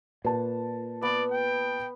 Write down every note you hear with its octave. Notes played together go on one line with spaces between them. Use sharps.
A#2 B4 A5
B3 D5
G5